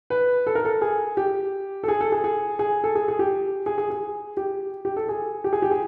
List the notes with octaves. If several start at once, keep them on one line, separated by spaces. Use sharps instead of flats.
B4
A4
A#4
A4
G#4
G4
A4
G#4
A4
G#4
G#4
G#4
A4
G#4
G#4
G4
G#4
G#4
G#4
G4
G4
A4
G#4
G4
G#4
G4
G#4